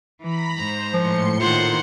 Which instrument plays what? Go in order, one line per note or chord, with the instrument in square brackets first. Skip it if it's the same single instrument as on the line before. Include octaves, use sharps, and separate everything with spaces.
[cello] E3 [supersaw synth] A#5 B5 B6
[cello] G#2 [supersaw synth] C5 [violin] A#5
[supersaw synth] A2 C6 C#7 [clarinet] F3
[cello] A#2 D#3 [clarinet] F4 [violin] C5 F#5